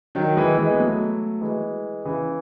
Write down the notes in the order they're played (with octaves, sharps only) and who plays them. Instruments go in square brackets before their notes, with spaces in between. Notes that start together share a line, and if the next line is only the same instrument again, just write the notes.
[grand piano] D#3 F#3
E3 G#3
E3 G#3
B3
F#3 A3
E3 G#3
C#3 E3